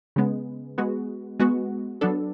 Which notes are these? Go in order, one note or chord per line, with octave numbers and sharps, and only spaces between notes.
C#3 G#3 B3
G#3 B3 F#4
G#3 B3 F#4
F#3 B3 D4 A4